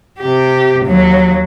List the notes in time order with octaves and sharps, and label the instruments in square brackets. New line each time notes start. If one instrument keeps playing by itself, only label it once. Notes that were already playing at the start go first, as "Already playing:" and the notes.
[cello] C3 G4
D#2 F#3